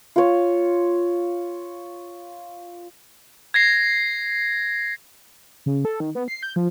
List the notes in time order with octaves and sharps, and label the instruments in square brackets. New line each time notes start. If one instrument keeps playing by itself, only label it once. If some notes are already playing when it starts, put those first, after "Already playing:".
[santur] F4 C#5
[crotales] G#6 A#6 C7
[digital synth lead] C#3
A4
D#3
B3
C7
G6
F3